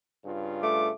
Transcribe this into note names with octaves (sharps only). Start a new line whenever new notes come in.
G2 C#3 F4
A3 D6